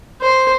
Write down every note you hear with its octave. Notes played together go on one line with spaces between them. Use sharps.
C5